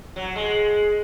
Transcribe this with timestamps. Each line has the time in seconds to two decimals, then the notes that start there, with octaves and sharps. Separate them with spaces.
0.16 F#3
0.36 G#3